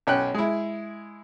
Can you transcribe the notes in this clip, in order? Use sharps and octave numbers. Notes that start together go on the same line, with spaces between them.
B1 C#4 G5 F#6
G#3 E4